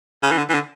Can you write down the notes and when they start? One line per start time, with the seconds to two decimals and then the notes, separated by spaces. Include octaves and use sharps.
0.23 C#3
0.31 E3
0.38 D3
0.49 E3
0.54 D3